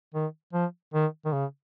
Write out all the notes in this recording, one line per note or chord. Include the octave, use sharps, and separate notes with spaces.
D#3
F3
D#3
D#3
C#3